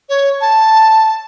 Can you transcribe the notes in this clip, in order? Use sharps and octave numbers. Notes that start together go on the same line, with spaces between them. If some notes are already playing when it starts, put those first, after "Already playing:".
C#5
A5